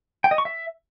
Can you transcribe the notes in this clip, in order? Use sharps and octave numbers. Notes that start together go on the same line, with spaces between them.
G5
D#5
C#6
E5